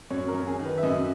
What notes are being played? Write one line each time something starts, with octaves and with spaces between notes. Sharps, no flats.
F#2 C#5
A#4
F#2
G#4
D#3
B4
E5
F#2 D#5